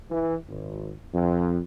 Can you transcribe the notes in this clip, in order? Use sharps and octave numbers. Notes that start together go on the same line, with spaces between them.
E3
G#1
F2